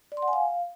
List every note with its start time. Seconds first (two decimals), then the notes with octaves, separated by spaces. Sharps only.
0.12 D5
0.17 C6
0.22 F#5
0.28 G#5
0.33 F5